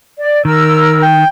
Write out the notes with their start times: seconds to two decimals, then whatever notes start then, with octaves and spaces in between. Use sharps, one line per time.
0.19 D5
0.45 D#3 A#4 E6
1.02 G5